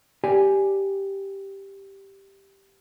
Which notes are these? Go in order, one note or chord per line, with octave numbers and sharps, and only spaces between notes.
G4 D5 G#5